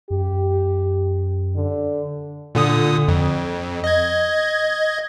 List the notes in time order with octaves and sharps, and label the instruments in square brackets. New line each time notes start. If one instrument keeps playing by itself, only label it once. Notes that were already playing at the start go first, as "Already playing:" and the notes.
[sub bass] F#2 [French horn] G4
[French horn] D3
[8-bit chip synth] A#2 D3 D#6
F2
D#5 G#6